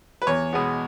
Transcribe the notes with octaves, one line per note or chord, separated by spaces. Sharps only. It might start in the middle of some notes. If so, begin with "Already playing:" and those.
B4
E2 C#5
B2 G#3 B3